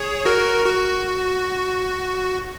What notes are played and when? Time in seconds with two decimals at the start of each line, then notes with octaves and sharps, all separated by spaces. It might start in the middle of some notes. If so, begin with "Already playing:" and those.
Already playing: G#4 C#5
0.25 F#4 A#4
0.66 F#4